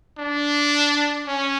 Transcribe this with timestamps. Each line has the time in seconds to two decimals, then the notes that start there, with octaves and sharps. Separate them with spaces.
0.18 D4
1.27 C#4